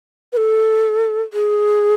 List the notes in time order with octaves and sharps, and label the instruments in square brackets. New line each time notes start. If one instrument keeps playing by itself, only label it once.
[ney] B4
A4
G#4